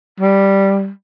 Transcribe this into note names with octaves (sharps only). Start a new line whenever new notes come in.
G3